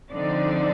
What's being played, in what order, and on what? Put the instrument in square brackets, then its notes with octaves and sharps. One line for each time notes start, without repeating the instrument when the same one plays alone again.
[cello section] D3 F3 C4 D4 D#4 D5